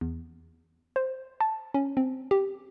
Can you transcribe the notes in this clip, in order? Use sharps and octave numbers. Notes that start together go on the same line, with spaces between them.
E2
C5
A5
C#4
C4
G4